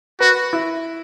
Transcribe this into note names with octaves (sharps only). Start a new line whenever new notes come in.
F#4 B4
E4